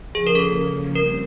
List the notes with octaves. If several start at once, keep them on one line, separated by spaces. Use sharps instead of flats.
C#3 F3 A#3 C#4 G#4
A#4
A4
G3 C4 A#4